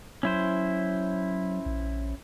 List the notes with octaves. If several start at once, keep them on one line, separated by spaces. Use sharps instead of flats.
F#3 C#4 E4 C5
A#1